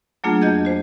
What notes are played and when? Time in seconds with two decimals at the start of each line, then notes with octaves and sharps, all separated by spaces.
0.24 F#3 A3 A#3 D4 F4 G#4
0.42 F2 F#4 D#5 G6 G#6
0.65 F#4 C5